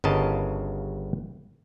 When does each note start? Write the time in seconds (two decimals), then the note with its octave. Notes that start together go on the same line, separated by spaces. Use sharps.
0.04 G1 G2 C#3 A#4 D#5 A5